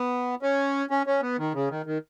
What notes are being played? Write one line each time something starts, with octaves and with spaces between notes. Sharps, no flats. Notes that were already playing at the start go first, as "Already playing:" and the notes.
Already playing: B3
C#4
C#4
C#4
B3
D#3
C#3
D#3
D#3